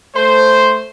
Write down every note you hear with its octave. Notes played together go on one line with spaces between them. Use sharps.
A3 C5